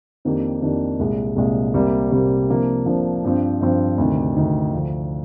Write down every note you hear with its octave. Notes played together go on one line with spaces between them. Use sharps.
F2 D#3 A#3 D4 G4
F2 D#3 A#3 D4 G4
C2 A#2 G#3
C2 A#2 G#3
C2 C3 G3 A#3
C2 C3 G3 A#3
C3 F3 A#3 D4
C3 F3 A#3 D4
G2 F3 C4
G2 F3 C4
D2 C3 D#3
D2 C3 D#3
D2 D3 F3